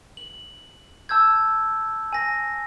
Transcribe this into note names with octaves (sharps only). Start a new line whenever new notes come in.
F#7
A5 E6 G6 G#6
G#5 A#6